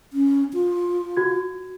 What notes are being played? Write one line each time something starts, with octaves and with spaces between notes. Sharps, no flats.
C#4
F4
F#4 G#6